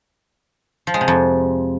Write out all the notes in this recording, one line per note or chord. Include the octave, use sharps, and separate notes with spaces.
F3
G#3
C3
F2